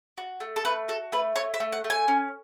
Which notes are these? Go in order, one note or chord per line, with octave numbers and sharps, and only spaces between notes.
F#4
A3
A4
A3 B4
F#4 A4
A3 B4
A3 C#5
E5
A3
F#5
A3
G#5
C#4